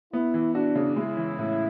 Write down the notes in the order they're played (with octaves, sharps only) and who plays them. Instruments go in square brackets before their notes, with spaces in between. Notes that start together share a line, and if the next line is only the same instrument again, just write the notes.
[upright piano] B3 [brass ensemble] E4
[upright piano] E3
[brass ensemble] D4 [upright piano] F#4
[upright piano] C#3
[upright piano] G#3 [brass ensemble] E4
[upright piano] E3
A2